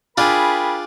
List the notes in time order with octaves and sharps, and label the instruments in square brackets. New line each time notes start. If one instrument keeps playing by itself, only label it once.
[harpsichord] D4 F4 [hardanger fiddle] G#4 [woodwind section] A#4 G5 B5